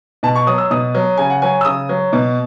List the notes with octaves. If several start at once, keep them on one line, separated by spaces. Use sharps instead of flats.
B2 A5
C#6
F#3 D#6
E6
B2 D#6
F#3
C#3 G#5
F#5
F#3 G#5
E6
C#3 D#6
F#3
B2